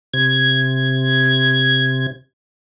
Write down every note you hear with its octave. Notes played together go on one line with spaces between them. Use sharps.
C3 G#6